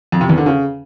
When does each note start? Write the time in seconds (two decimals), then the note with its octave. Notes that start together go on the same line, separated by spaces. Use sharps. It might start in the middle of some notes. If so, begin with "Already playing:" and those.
0.12 F2
0.21 C3
0.29 E2
0.38 D3
0.46 C#3